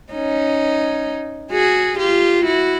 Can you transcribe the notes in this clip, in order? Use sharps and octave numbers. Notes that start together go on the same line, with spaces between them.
C#4 D#4
F#4 G#4
F4 G4
E4 F#4